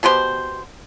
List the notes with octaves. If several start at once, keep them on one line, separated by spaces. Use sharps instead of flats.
B2 B3 G4 C5